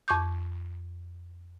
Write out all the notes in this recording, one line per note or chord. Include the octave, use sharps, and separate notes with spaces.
F2 C#6 D6 G6